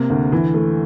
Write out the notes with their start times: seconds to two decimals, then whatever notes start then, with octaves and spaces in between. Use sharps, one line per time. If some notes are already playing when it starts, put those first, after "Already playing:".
Already playing: C3 A#3
0.10 D2
0.32 E3
0.54 A3